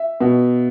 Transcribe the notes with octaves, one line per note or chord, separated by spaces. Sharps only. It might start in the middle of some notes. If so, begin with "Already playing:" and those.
Already playing: E5
B2